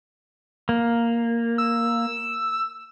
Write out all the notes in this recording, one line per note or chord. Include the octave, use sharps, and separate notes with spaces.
A#3
E6